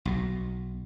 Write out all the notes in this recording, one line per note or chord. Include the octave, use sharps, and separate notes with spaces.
B1 B2